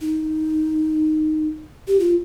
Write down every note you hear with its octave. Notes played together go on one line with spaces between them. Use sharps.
D#4
G4
F4